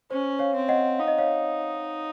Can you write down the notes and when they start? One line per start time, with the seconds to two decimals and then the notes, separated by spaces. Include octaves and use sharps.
0.11 C#4 C5
0.39 C#5 F5
0.55 C4
0.68 D#5 F#5
0.99 D#4 F5
1.08 D#5
1.18 C#5 F5